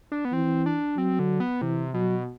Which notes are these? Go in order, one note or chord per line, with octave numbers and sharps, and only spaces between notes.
D4
B3
E3 C4
D4
F#3 C4
D3
B3
C3 E3
B2 F#3